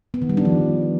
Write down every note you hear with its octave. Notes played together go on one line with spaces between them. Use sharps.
B3
D#3
G3
D4
F3